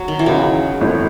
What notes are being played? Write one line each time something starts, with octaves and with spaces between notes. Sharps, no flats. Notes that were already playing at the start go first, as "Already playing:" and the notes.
Already playing: F#3
D#3
E3
C#2 C#3 F#3 G#3
G#1 F#2 E3 A3